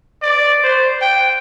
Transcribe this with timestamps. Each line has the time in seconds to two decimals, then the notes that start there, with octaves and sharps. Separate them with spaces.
0.22 D5
0.63 C5
1.01 G5